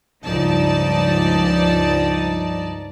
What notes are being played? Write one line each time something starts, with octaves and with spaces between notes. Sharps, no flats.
C#2 G2 F3 D#4 D5 A5